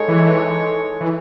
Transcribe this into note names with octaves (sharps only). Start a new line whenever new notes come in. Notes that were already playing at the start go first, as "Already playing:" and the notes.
Already playing: G#3 D#4 A4 C#5
E3
E3